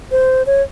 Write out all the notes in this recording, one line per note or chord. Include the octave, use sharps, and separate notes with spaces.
C5
C#5